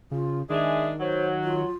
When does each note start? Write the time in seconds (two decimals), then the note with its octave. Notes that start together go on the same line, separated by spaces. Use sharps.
0.11 C#3 F4
0.50 D#3 G#3 D4 G#4 E5
0.99 F#3 C5
1.43 F4